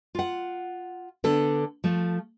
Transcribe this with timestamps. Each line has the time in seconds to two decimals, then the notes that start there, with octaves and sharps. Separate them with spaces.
0.15 F4 F#5
1.24 D3 B3 D4 A4
1.84 F3 A3